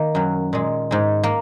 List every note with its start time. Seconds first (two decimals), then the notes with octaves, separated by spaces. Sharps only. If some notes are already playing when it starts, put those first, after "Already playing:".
Already playing: D#3 A#3
0.15 F#2 F#3
0.53 A#2 G#3
0.91 G#2 G#3
1.23 A#3